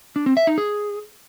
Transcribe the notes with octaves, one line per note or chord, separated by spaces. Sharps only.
D4
C4
E5
D#4
G#4